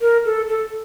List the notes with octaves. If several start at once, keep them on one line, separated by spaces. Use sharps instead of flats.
A#4
A4
A4